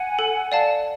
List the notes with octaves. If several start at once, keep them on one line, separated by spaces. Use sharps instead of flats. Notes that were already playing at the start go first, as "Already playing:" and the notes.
Already playing: F#5 G#5
A4
D5 F5 A5